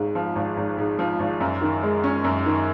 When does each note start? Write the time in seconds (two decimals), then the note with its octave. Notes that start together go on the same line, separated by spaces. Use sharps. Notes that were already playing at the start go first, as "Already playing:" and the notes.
Already playing: G#1 G#2
0.15 F3
0.36 G#1
0.57 G#1
0.78 G#2
0.99 F3
1.19 G#1
1.40 F#2
1.61 D#3
1.83 G#3
2.04 C#4
2.24 F#2
2.46 D#3